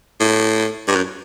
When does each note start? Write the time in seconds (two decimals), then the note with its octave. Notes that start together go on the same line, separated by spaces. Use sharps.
0.20 A2
0.88 G2
0.96 F#2